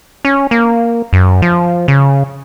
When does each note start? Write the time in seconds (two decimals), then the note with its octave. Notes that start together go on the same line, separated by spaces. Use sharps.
0.25 C#4
0.51 A#3
1.13 F#2
1.42 F3
1.88 C#3